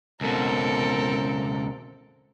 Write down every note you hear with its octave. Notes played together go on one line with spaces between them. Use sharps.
C#2 B2 C4 A4 A#4